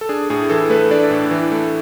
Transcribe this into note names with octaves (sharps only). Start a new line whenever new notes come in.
A4
D4 G#4
A2 G#4
E3 A4
A3 B4
D4 D5
A2
E3
A3